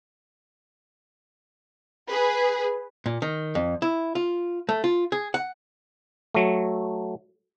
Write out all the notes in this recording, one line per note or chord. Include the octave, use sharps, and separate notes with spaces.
G#4 B4
A#2
D#3
F2
E4
F4
A3
F4
G#4
F#5
F#3 A3